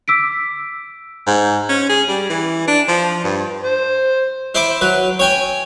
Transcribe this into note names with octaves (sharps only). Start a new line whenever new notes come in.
D6 E6 B6 D7
G#2
C#4
G#4
G3
E3
D4
F3
G2
C5
E4 C5 B5 D6
F#3 B4
C#5 G5 G#5